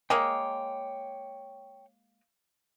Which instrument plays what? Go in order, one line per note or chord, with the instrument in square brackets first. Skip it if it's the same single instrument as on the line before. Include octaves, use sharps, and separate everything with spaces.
[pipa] G#3 A#3 [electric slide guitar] C#5 G5